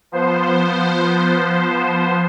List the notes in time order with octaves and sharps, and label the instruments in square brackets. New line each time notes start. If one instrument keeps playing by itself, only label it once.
[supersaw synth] F3 B3 C5